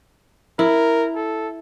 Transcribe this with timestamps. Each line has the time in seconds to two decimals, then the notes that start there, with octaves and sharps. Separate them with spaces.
0.59 E4 A#4
1.16 A4